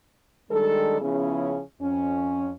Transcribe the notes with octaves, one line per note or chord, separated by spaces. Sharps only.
D#3 G3 G#3 D4 A4
C#3 F3 B3 C#4 E4 G#4
F2 C#4